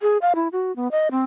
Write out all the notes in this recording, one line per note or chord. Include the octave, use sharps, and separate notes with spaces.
G#4
F5
E4
F#4
B3
D#5
C4